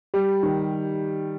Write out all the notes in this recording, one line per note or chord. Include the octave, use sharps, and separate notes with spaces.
G3 G4
D#3